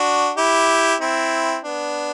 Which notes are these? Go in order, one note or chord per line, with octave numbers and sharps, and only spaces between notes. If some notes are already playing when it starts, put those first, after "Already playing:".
Already playing: D4 F#4
E4 G4
C4 E4
B3 D4